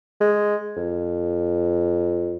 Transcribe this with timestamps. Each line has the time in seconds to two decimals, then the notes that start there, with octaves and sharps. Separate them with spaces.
0.21 G#3
0.76 F2